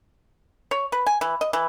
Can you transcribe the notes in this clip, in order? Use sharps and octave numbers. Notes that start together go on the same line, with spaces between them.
C#5
B4
G#5
E3
D#5
E3